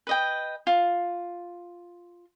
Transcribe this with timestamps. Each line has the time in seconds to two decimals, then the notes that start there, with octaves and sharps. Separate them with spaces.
0.07 B4 D#5 G5
0.67 F4